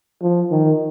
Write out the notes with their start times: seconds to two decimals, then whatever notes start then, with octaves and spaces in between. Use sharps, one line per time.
0.22 F3
0.51 D#3